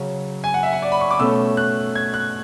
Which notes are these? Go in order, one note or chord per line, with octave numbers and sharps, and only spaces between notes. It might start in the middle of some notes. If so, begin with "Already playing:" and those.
Already playing: C#3 F#3 C#4
G#5
F#5
E5
F#5
D5
B5
C#6
D6
B2 A3 C#4 E6
F#6
G#6
F#6